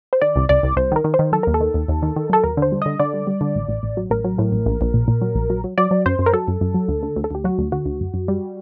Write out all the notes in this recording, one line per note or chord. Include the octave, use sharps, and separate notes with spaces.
C5
D#3 D5
C2
C2 D5
C2
C2 C5
D#3
A#4
D#3
C5
D#3
F#3 A4
D#2 A#4
A4
D#3
D#2
D#2
D#3
D#3
F#3 A4
D#2 A#4
D3 C5
G3
D3 D#5
D3 D5
G3
G3
D3
A1
A1
A1
F#3
A1 A#4
F#3
A2
A1
A#1
A#1
A#2
A#2
F#3
A#1
F#3
F#3
F#3 D5
F#3
F#2 C5
F#2
A#4
F#3 A4
F#2
F#2
F#3
D2
D3
D2
A4
D2 G4
F#3 F#4
D2
D3 F#4
D2
F#2
F#2
G3